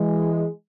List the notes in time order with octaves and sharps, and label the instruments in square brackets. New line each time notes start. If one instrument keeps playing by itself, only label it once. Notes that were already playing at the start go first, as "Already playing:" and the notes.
Already playing: [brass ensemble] E3 G#3